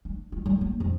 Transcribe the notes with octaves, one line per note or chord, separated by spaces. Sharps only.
D4
F4
F#3
A#3
F2